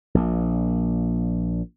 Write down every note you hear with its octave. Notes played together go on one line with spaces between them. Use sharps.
A#1 A#2